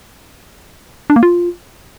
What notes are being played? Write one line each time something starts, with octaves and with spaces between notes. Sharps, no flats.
D4
A#3
F4